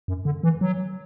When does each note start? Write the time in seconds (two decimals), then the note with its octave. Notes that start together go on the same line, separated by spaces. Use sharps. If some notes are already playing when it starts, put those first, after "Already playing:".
0.08 F#2
0.25 D3
0.43 E3
0.61 F#3